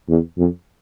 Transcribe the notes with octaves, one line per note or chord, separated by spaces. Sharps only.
E2
F2